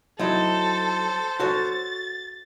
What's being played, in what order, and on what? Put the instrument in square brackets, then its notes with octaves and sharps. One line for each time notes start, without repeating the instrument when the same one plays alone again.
[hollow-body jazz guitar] F#3 D#4 E4 [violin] A4 [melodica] C5
[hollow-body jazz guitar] F#4 A4 C#5 [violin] A6